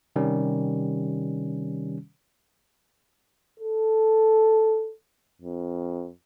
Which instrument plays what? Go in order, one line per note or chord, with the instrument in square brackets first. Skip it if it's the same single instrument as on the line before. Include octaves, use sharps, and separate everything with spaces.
[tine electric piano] C3 D#3 G3 C#4
[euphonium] A4
F2